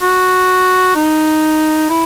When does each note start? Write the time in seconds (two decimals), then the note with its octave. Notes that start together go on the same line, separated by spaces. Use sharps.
0.01 F#4
0.96 D#4
1.90 E4